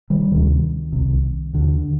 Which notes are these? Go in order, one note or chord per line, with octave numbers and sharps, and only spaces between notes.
D#3 G3
D2 C3 D#3
C2 C3
D#2 D3